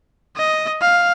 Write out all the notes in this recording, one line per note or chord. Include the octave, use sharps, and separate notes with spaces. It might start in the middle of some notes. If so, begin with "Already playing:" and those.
D#5
F5